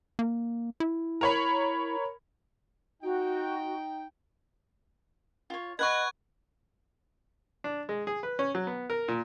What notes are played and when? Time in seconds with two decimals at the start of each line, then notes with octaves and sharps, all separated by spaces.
0.19 A#3
0.80 E4
1.21 A#4 C#5 B5
3.02 D#4 F#4 G5
5.50 F4 C#5
5.79 B4 D#5 F#5 C#6 F#6 G#6
7.64 D4
7.89 G#3
8.07 G#4
8.23 B4
8.39 C#4
8.55 F#3
8.67 B3
8.90 A#4
9.08 A#2